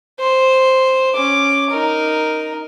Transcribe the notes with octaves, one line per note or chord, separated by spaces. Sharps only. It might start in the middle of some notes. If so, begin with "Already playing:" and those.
C5
C#4 D6
D#4 A#4